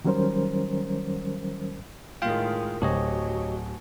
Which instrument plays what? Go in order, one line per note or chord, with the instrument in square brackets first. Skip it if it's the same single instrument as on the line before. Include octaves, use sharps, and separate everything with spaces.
[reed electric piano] D#3 F#3 G3 C#4 A#4 C5
[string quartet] A2 D#3 G#3 [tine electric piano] F4 F5 G5
[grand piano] D1 [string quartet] F#3 [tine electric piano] G4 C#5 D#5